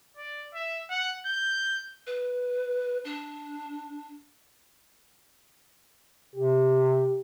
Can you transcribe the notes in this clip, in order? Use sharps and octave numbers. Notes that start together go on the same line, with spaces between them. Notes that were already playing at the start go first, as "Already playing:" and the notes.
D5
E5
F#5
G6
B4
D4
C3 G4